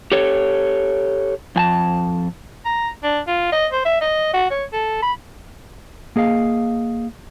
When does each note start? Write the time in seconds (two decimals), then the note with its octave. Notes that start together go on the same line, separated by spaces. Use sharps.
0.12 G4 A4 C#5
1.56 F2 G#5 A5
2.65 A#5
3.03 D4
3.28 F4
3.52 D#5
3.73 C5
3.85 E5
4.01 D#5
4.34 F#4
4.51 C#5
4.73 A4
5.02 B5
6.16 A#3 G#4 D#5 F5